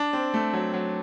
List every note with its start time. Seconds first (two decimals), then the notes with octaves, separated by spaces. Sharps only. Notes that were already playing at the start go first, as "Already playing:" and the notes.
Already playing: D4
0.13 C4
0.34 A3
0.53 F#3
0.73 F#3